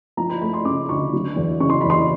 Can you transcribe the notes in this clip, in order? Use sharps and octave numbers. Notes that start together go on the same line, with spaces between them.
F3 A#5
B5
A3 B5
C6
C#3 D6
D2 C#6
F#3
E2
C#3 C#6
C6
E2 B5
C6